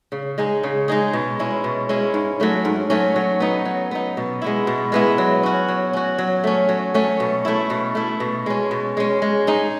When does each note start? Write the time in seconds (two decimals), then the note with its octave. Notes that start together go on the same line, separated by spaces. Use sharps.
0.12 C#3
0.38 G#3 D#4 G#4
0.63 C#3
0.88 G#3 D#4 G#4
1.13 B2
1.39 G#3 C#4 E4
1.64 B2
1.89 G#3 C#4 E4
2.14 G#2
2.40 F#3 A3 C#4
2.65 G#2
2.90 F#3 A3 C#4
3.16 F#3
3.40 B3 D#4
3.65 F#3
3.91 B3 D#4
4.17 B2
4.42 G#3 B3 E4
4.67 B2
4.92 G#3 B3 E4
5.18 F#3
5.43 C#4 F#4
5.68 F#3
5.93 C#4 F#4
6.18 F#3
6.44 A3 C#4
6.69 F#3
6.94 A3 C#4
7.20 B2
7.45 A3 E4
7.70 B2
7.95 A3 E4
8.20 B2
8.46 G#3 C#4
8.71 B2
8.97 G#3 C#4
9.22 G#3
9.47 D#4 G#4